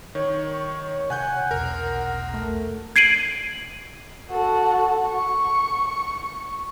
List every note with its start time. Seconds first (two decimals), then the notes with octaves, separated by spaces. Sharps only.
0.15 D#3 C#5
1.10 C3 F#5 G#5 F#6 G6
1.51 B1 E2 B2 A#4
2.34 A3
2.96 G#6 C7 D7 D#7 F#7
4.30 F#4 A4
5.08 C#6